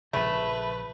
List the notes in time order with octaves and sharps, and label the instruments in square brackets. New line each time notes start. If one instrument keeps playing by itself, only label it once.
[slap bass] A#1 C#3 [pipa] A3 [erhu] B4